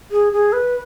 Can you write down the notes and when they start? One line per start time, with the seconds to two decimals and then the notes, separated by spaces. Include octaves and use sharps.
0.11 G#4
0.33 G#4
0.53 B4